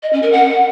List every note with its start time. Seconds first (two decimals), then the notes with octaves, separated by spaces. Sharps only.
0.03 D#5
0.13 C#4
0.23 A#4
0.32 F#5